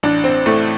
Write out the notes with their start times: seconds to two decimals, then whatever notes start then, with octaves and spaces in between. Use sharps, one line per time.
0.03 A1 D4
0.24 C4
0.46 A2 A3